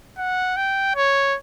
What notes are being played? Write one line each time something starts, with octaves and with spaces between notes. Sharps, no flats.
F#5
G5
C#5